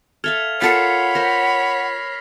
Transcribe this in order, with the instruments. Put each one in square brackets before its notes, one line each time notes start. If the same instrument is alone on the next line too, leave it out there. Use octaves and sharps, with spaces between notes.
[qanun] A4 E5 F5 [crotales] F6 G#6 F7
[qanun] F4 A4 A#4 [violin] C#5 B5 [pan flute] F#5 [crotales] B6 C7
[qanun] A#4 C5 [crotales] A#6
[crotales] B6